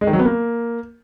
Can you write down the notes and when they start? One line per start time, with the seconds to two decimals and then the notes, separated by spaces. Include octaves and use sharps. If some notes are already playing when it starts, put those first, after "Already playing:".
0.01 G#3
0.07 D#3
0.13 F#3
0.19 B3
0.25 A#3